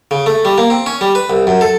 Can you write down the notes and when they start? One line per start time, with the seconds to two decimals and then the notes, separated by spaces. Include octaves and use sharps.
0.11 C#3
0.26 A3
0.45 G3
0.58 A#3
0.70 C4
0.86 C#4
1.01 G3
1.15 B4
1.30 C2
1.47 F#2
1.61 A4